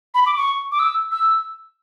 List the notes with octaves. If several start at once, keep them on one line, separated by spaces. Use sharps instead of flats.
B5
D6
C#6
D6
E6
E6